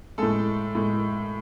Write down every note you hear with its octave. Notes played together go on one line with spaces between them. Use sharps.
A2 G#3 A4
A2 G#3